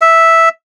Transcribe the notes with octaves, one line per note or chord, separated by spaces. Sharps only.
E5